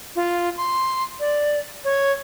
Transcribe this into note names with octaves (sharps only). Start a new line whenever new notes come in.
F4
C6
D5
C#5